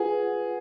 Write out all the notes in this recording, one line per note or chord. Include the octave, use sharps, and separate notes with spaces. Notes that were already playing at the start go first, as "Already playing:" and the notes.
Already playing: F4 G#4 B4 F#5